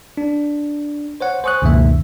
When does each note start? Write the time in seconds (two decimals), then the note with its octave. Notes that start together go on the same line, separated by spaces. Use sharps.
0.17 D4
1.21 C5 C#5 F#5
1.44 C5 G#5 C#6 D#6 F#6
1.62 C#2 F#2 B2 D#3 A#3 E5